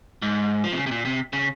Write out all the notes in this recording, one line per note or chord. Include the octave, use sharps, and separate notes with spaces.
G#2
F3
C3
C#3
C3
A#2
C3
C#3